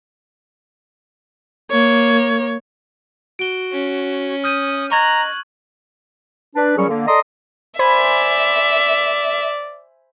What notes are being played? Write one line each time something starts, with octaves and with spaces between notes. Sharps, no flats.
A#3 C#5
F#4 D7 G7
C#4
D#6 F6 G6 D#7
D#5 A#5 C#6 F#6 G#6
D4 B4
A#2 F#3 G3 C#4 G#4 C#6
D3 A#3
A4 D5 D#5 A#5 C6 D#6
C5 D5 E5 G#5 B5